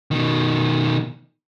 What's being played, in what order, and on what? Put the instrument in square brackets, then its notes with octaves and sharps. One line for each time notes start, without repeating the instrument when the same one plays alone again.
[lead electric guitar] B2 D#3